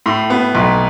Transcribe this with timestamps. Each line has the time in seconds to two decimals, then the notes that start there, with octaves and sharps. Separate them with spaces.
0.06 A2
0.30 B3
0.55 B1